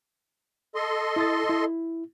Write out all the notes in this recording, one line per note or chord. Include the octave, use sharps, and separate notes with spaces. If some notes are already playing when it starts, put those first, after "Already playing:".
A4 D#5 C6
E4 D#6 A6
E4